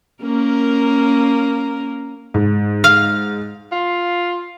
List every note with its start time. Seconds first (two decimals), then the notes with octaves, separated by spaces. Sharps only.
0.22 A#3 C#4 A#4
2.34 G#2
2.84 F5
3.72 F4